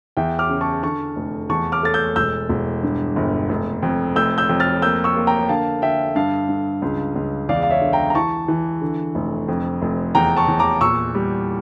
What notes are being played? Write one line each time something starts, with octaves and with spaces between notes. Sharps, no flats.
E2 E5 G5
D6 F6
C#3
A5 C#6
D3 A5 C#6
F1
E2 A5 C#6
D6 F6
A3 A6
E6 G6
E1 E6 G6
E1
G2
G1
F1
F2
F1 E6 G6
E6 G6
F2
F6 A6
A#3 E6 G6
C#6 E6
A#3
G5 A#5
D3 F5 A5
D3 E5 G5
G2 F5 A5
G2
C#2
C#2
E2 D5 F5
F5
C#5 E5
D3
G5 A#5
A#5
E3 A5 C#6
E3
D3
F1
F2
F1
E2 G5 A#5
A5 C#6
E2
A#5 D6
A#2 C#6 E6
G3